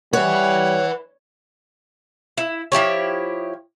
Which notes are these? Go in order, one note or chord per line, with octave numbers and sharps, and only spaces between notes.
G3 B4 C#5 E5 F#5
E4
F3 E4 G4 C#5